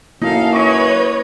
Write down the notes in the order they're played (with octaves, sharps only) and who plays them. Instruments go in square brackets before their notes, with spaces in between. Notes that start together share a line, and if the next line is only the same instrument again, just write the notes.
[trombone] F#2 [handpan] A#3 E4 F#4 [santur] D#4 [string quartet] A4 F5
[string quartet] B4 C#5 [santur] D#5 C#6 D6